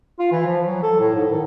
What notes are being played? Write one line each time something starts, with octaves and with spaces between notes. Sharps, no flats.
F4
E3
F3
F#3
A4
A2
G#2
D#3